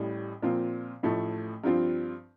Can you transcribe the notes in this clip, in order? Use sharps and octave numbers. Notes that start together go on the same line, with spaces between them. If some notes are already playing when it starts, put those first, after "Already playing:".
Already playing: A1 A2 G3
A#2 F3 C4 F4
A1 A2 F3 A3
G2 F3 C4 F4